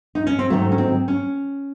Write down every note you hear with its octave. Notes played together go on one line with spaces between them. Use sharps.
D#4
C#4
C4
G#2 D#3 F#3 A3
C#4
C4
C#4